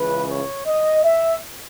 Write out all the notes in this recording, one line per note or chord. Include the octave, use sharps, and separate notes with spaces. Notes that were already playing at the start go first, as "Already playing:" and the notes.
Already playing: C#2 C#3 E3 B4
C#5
D#5
E5